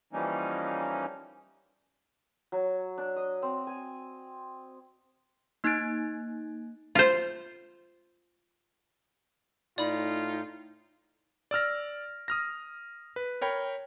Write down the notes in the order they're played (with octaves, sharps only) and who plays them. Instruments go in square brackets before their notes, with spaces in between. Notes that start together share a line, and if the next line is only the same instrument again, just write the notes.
[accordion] E3 F3 G3 A#3 C#4 D#4
[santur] F#3
D4
D#5
C4
G#5
[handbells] A#3 D#4 F#6 G#6 A6 D7
[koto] F4 C5
[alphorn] A2 [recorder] D#4 [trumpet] F4 [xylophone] D5 B5
[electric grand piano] D5 E6 F6 A#6
D#6 F6 A#6
B4
A#4 C#5 G5 B5